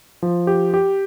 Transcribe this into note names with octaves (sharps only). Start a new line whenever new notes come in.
F3
G4
G4